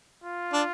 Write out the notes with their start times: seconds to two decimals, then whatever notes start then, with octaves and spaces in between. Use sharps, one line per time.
0.24 F4
0.53 D4